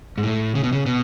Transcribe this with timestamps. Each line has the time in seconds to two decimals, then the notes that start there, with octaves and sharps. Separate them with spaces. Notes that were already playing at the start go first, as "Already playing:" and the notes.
0.18 G#2
0.23 A2
0.55 C#3
0.64 B2
0.73 C#3
0.86 B2